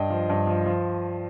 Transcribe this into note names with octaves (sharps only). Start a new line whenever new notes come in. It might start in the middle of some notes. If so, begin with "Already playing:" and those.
Already playing: G2 D#5 G5
F3
G2
F3
F3